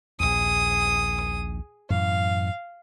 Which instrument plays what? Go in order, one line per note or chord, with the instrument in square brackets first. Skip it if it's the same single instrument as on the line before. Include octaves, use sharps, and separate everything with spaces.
[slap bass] A#1 D#2 [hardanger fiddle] G#4 D#6
[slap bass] F#2 A2 E3 [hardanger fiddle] F5